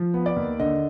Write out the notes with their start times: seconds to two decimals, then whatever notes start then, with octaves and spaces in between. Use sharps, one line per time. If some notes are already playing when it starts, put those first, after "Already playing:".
Already playing: F3
0.14 B3
0.26 D5
0.36 D#2
0.60 D3 D#5